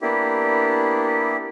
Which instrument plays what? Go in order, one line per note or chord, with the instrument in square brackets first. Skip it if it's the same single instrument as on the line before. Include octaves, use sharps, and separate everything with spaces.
[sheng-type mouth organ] A#3 B3 D4 E4 G4